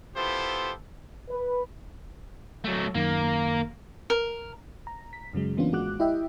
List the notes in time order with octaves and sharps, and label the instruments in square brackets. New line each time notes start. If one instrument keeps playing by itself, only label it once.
[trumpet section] B3 E4 F4 G4 A4 C5
[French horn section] B4
[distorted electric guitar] F#3 A3
[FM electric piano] F#2 D#3 [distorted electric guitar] A#3
[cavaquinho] A#4
[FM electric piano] A#5
B6
F#2 C#3 F#3 G#3
E3 A#3 B3 C#4 D4 F4
G#1 G#3 F#4 D6 F#6
E4 G4 D#5 E5 G5